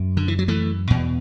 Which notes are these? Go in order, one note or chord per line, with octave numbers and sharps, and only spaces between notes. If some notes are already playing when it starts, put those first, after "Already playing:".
Already playing: F#2
D3
E3
F#3
E3 A3
E2 B2